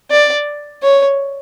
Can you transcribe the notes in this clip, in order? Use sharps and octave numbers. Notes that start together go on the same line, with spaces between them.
D5
C#5